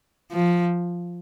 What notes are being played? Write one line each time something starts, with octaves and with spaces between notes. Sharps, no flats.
F3